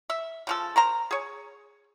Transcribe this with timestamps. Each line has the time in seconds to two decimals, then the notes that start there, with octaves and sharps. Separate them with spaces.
0.10 E5
0.47 C#3 F3 A4
0.76 A#4 C5 A#5
1.11 G#4 C#5